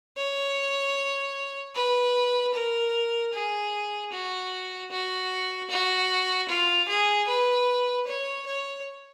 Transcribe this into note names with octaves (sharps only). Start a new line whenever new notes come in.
C#5
B4
A#4
G#4
F#4
F#4
F#4
F4
G#4
B4
C#5
C#5